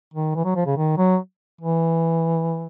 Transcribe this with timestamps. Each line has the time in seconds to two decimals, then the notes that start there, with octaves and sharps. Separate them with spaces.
0.14 D#3
0.35 E3
0.45 F#3
0.56 F3
0.66 C#3
0.77 D#3
0.98 F#3
1.61 E3